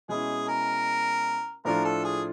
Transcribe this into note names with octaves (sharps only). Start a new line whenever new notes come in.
B2 G#3 C#4 E4 G#4
A#4
A2 F3 A3 D4 F4 A#4
A4
G#4